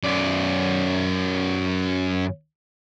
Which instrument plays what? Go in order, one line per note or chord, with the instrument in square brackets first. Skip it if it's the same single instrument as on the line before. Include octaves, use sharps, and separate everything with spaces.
[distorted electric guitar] F#2 D5